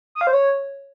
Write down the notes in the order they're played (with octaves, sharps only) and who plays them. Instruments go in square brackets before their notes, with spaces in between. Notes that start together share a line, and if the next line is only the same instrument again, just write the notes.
[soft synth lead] D#6
F5
C5
C#5